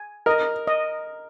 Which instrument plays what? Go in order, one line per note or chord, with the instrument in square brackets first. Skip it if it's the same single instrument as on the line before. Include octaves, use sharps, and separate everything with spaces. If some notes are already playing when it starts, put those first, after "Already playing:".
Already playing: [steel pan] G#5
[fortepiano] A#4 [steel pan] D#5
[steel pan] D#5